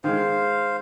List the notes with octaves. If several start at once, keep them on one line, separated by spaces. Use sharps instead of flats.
D#3 G#3 C5 F5